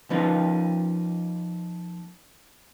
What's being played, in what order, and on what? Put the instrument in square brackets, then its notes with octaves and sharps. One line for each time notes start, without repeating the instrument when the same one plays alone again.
[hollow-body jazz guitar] F3 A#3 C#4 D#4 F4 B4